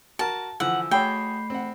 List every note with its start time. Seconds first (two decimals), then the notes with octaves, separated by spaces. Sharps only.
0.19 F#4 A#4 A5
0.60 D3 E3 F3 F#5 E6
0.91 A3 F#4 G#4 C#5 G5 B5 C7
1.50 C4 F#5